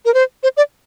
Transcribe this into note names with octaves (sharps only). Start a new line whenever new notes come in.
A#4
C5
C5
D5